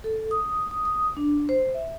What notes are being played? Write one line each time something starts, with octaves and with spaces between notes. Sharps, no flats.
A4
D#6
D#6
D#6
D4
C5
E5